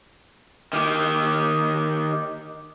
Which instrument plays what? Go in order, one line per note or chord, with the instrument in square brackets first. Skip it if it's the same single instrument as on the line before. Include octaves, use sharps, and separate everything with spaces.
[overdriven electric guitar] D#3 G4